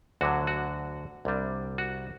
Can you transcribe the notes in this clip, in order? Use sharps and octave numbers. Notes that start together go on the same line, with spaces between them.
D2 D3 F#3 F#4
F#4
C2 C3 G3 D4
F#4